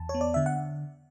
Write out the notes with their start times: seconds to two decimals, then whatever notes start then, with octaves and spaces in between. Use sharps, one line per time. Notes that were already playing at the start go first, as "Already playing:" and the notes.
Already playing: E2 A5
0.09 C#5
0.14 B3
0.21 D5
0.34 D3 E5
0.46 F#5